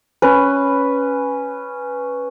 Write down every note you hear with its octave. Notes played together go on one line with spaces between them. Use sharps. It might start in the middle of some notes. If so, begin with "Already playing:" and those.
C#4 B4